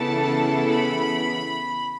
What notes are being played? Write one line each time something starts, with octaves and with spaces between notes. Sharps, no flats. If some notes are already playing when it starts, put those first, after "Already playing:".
Already playing: C#3 E3 B3 E4 A4 A5
B5